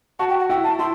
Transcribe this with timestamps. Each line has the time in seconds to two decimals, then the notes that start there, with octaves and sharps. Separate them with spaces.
0.19 F#4 A5
0.29 G5
0.39 F#5
0.49 E4 G5
0.64 A5
0.79 E4 C6